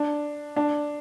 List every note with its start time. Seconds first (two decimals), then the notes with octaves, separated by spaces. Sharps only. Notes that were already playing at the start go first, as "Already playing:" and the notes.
Already playing: D4
0.56 D4